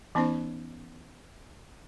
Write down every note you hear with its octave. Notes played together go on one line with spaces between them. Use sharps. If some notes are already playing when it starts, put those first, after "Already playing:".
E3 B3 C#4 D#4 C5